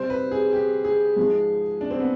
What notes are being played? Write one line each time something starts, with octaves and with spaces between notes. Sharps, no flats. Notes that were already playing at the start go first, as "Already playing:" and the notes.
Already playing: C3 G3 C5
B4
G#4
G4
G#4
G#2 F3 G#3
D4
C4
B3